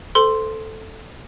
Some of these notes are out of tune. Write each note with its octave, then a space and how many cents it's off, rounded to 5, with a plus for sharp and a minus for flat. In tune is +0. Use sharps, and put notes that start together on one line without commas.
A4 +0 C5 -30 C6 +0